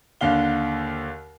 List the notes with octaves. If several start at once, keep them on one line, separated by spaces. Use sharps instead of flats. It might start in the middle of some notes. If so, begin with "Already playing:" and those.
D#2 D3 F5 G7